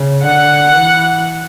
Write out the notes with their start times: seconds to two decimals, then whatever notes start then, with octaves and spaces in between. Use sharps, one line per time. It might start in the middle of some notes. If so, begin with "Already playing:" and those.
Already playing: C#3
0.23 D3 F#5
0.75 E3